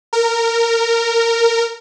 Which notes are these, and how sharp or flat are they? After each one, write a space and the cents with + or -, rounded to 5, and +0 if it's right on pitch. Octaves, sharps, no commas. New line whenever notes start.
A#4 -15